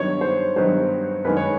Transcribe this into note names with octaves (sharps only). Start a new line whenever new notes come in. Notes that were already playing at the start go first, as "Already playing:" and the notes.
Already playing: G2 D#3 F#3 B3 D#4 C#5
C5
G2 D#3 F#3 B3 D#4 C5
F#2 D#3 G#3 C#4 B4
C#5